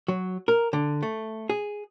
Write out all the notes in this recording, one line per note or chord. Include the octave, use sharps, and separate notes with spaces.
F#3
A#4
D3
A3
G#4